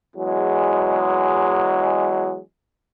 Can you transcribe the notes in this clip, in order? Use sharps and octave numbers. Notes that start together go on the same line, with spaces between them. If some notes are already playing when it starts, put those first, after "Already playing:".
E2 F#3 G#3